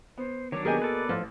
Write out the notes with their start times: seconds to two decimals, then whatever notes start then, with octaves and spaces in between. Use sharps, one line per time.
0.18 B3 C5
0.52 D#3 F#3 D4 C#5 D6
0.65 B2 A#3 G4 G#4 A#4 D#5 G#5
0.82 A4 B4 D5
1.09 A1 F3